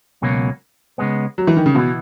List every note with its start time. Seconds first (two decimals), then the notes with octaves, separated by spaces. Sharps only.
0.22 C#2 B2 F#3 A#3 C#4
0.98 C#3 G#3 B3
1.38 F#3
1.47 E3
1.57 D#3
1.66 C#3
1.75 B2 E3 B3 E4